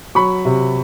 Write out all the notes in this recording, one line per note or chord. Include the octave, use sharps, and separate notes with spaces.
F#3 B5 C#6
C3